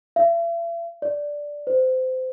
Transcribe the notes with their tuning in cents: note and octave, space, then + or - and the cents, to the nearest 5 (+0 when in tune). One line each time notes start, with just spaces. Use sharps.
E5 +45
D5 -5
C5 -25